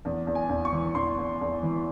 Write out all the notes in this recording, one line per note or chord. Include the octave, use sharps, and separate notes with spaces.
E2
E2
G#5
E2
C#6
E3
E2 C6
E2
E2
E3